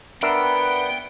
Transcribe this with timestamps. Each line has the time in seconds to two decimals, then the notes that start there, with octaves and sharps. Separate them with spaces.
0.22 B3 D4 A#4 E5 F#5 G5 B5